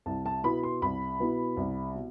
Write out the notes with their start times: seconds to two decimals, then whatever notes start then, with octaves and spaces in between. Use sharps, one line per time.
0.06 C2 A5
0.26 A5
0.44 B2 B3 E4 B5
0.63 C6
0.82 C2 B5
1.20 B2 B3 E4
1.57 C2
1.95 B2